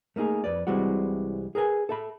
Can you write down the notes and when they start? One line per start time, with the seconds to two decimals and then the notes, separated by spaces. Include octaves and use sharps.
0.16 A3 A#3 D#4 G#4
0.44 F2 B4 D5
0.67 C2 C3 E3 G3 G#3 F#4
1.55 G#4 A#4 B4 G#5
1.89 A4 E5 B5